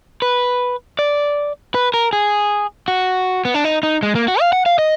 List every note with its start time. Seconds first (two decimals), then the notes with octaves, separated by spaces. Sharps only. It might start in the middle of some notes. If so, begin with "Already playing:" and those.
0.22 B4
0.99 D5
1.75 B4
1.94 A#4
2.13 G#4
2.88 F#4
3.45 B3
3.54 D4
3.64 D#4
3.83 D#4
4.03 G#3
4.15 A#3
4.28 F#4
4.40 F5
4.53 F#5
4.66 F5
4.79 D#5